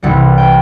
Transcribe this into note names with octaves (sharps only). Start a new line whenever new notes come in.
C2 C3 E3 G3 F#5
G5